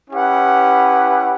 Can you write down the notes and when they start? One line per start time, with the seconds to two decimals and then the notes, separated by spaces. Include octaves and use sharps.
0.10 C#4 E4 G4 B4 F#5